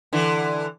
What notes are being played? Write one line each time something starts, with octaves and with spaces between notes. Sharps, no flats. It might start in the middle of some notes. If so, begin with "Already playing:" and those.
D3 E3